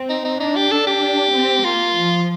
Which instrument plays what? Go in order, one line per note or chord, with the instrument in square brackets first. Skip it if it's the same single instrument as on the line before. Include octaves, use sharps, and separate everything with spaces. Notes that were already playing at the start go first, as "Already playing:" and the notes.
Already playing: [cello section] C4
[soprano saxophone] D#4
D#4
[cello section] D4 [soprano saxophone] D#4
[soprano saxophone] G4
A4
G4
[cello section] C4
[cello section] A#3 [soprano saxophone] F4
[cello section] F3